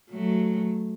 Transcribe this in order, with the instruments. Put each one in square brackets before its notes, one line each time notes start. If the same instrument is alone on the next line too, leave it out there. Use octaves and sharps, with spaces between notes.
[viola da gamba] F#3 A3